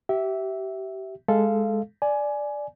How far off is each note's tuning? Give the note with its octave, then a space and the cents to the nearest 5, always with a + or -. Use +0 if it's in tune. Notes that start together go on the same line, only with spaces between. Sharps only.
G4 -30 E5 -5
G#3 +0 A4 -5 F5 -20
D5 +0 G#5 +15